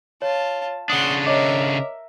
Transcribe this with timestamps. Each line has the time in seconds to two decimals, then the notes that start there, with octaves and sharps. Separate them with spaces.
0.22 F4 C#5 A5
0.90 C#3 D4 F#5 C6 D#6
1.26 A#4 C#5 D#5 E5 D6